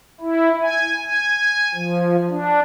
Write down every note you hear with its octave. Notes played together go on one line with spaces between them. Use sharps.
E4
G#5
G#5
F3
D4